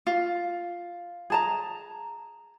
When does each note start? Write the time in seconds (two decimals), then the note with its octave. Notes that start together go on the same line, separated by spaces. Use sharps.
0.07 F4
1.30 G#4 A5 A#5